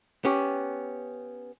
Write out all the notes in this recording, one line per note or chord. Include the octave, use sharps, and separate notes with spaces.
B3 C#4 G4